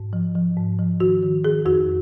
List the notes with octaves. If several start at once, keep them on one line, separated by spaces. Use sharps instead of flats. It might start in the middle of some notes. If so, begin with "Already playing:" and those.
Already playing: G#2
F3
F3
G#2
F3
D#3 F#4
D#3
D#3 G#4
F2 F#4